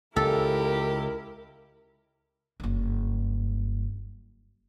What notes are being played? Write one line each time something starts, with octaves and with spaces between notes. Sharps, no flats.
C#2 E4 G4 A4 A#4
F#1 G2